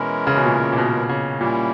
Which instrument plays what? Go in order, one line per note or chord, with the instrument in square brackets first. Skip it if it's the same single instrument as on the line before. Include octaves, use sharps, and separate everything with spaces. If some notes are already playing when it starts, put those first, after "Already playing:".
Already playing: [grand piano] B2 [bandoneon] E3 G#3 C#4 E4 A#4
[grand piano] C#3
B2
A#2
A#2
B2
C#3
[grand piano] A#2 [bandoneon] G3 A#3 C#4 E4